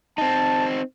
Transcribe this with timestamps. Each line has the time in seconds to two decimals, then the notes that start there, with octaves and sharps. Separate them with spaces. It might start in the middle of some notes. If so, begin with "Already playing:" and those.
0.18 C4 D#4 A5